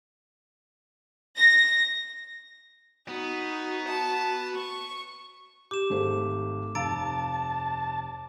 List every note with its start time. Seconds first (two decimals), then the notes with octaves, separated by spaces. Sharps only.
1.37 A#6
3.08 B3 D#4 F#4
3.88 A5
4.55 C#6
5.71 G4 D6 E7
5.90 G#1 A3 G4 G#4 C5
6.75 F1 G2 F5 A5 A#5 E6 A6 D7